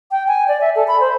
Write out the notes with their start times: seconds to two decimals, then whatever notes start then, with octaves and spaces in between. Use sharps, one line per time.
0.11 G5
0.28 G#5
0.48 D5
0.61 E5
0.76 A4
0.88 B5
1.00 C5